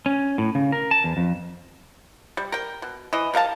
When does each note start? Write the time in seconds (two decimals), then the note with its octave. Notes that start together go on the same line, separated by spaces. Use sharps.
0.06 C#4
0.38 A2
0.55 C#3
0.72 A#4
0.91 A5
1.04 E2
1.17 F2
2.37 G3
2.52 A#4 G5
2.82 B2
3.13 E3 D#5
3.34 G3 A#4 F5 A5